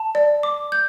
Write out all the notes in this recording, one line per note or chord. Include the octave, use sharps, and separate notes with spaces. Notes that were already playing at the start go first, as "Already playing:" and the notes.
Already playing: A5
D5
D6
G6